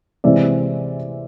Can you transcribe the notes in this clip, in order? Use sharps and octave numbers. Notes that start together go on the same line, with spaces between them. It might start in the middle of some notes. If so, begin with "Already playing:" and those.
C3 E3 G#3 C4 D5 E5